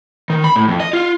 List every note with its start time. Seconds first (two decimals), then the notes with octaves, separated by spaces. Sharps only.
0.30 D#3
0.44 B5
0.56 A2
0.68 F2
0.80 D#5
0.93 F4